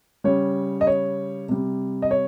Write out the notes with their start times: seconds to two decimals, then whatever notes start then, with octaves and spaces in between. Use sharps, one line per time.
0.24 C#3 G3 C#5
0.81 D#5
0.87 C#5
1.49 C3 G3
2.02 D#5
2.11 C#5